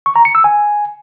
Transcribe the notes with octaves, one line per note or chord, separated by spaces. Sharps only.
C#6
A#5
C#7
E6
G#5